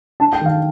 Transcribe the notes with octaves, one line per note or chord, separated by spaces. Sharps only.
D4 A5
G5
D#3 F5